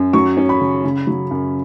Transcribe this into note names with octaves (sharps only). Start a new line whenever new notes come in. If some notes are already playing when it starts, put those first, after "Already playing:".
Already playing: F#2
F#3 C#6
C#4
B5
C#3
C#3
F#3
F#2